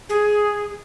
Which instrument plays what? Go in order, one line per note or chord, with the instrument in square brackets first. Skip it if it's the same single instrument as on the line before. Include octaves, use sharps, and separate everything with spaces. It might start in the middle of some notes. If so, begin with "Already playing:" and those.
[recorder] G#4